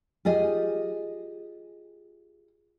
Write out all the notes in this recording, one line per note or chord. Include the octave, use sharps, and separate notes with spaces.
F4 G4 G#4 D#5